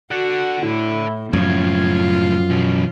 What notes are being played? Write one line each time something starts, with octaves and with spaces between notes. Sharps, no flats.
F#4 A4 D5 F#5
A2 E4
C#2 F#2 A2 F3 F4 G#6
B2 E3 C#4